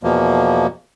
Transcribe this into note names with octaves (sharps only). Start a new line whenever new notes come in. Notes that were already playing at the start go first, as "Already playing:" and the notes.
E2 B2 F3 A#3